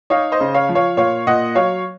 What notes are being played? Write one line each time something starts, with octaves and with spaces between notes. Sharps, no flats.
D#4 C#5 F5
C5 D#5
C#3
C#5 F5
F3
C#5 F5
A#2 C#5 F5
A#2 D#5 F#5
F#3 C#5 F5